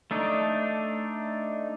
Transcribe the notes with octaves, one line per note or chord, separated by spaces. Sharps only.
A3 D4 D#4